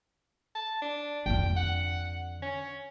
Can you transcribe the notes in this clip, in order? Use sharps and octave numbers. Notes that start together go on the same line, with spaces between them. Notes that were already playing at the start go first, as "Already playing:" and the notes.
A5
D4
F2 D3 G5
F#5
C#4